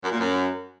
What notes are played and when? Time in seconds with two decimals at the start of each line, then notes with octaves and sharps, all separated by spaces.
0.04 F#2
0.11 A#2
0.19 F#2